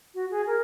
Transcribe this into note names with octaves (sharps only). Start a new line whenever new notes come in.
F#4
G#4
A#4